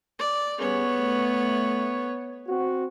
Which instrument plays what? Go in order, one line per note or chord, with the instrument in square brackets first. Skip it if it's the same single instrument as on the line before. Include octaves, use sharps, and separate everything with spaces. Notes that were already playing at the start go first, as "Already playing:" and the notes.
[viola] D5
[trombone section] G3 C#4 G#4 [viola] B3 C#5
[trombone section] A3
C4 F#4